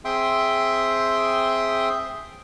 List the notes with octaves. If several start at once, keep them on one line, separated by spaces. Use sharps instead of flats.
C4 G#4 E5 G5 C6 D#6